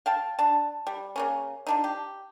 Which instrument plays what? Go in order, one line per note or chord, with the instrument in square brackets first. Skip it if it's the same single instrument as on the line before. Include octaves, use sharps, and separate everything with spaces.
[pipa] F5 G5 A5
D4 A5
G3
C#3 A#3 C#4
F3 D4 D#4
G4